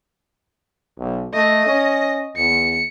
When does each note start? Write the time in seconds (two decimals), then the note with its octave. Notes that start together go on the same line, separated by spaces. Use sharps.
0.99 B1
1.33 A3 D#5
1.66 C#4
2.37 E2 C#7